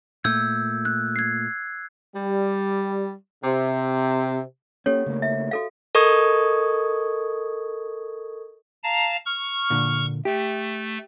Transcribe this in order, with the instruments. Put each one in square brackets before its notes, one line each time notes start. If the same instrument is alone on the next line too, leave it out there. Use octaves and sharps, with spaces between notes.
[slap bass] A#2 A3 [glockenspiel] E6 G6 G#6
[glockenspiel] F#6
G#6 C7
[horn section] G3
C3
[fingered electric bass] A#3 C#4 [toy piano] G4 A4 C#5
[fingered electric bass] C#3 A3 A#3
[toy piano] E5
F#4 A4 F5
[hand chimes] A4 A#4 D#5 C#6 D#6 G#6
[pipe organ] F5 A5 A#5
C#6 F6
[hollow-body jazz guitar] A#2 D3
[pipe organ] A3 [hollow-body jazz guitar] G4